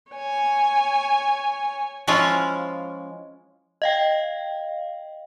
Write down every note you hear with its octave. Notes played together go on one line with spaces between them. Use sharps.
C#5 G#5
F3 G#3 C#4 E4 F4
D#5 F5 G5